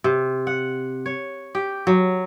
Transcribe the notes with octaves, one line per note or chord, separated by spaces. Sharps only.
C3
F#5
C#5
G4
F#3